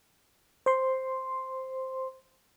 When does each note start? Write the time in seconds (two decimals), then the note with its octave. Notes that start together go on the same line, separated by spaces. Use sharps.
0.66 C5 C6